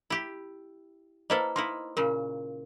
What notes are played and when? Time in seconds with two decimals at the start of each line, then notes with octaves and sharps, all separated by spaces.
0.10 E4 G4
1.30 A#3 E4 A4 B4 C5 D#5
1.56 A#3 D#4 E4 C6
1.97 A#2 C#3 A#4